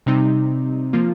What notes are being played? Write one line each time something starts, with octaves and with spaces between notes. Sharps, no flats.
C3 G3 C4 D#4
F3 A#3 F4